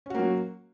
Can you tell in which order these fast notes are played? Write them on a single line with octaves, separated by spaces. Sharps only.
C#4 F#4 A#3 F#3